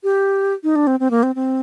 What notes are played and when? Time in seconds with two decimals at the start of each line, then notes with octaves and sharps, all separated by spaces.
0.04 G4
0.64 D#4
0.76 D4
0.87 C4
1.00 C4
1.11 A#3
1.23 C4
1.35 C4